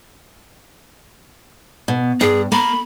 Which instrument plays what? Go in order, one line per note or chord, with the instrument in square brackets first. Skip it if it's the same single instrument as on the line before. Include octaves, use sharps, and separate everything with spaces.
[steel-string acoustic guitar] B2
[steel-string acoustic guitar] G2 [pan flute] G#4
[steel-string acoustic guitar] A#3 [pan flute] B5